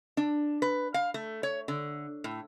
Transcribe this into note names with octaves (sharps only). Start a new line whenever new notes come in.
D4
B4
F5
A3
C#5
D3
A2